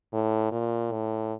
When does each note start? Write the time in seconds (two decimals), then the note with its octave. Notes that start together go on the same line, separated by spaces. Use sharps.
0.13 A2
0.52 A#2
0.92 A2